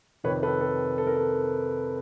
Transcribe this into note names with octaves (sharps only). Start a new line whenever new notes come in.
F2 C3 D#3 B4 C#5
A4 B4
A4
A4
A#4
A4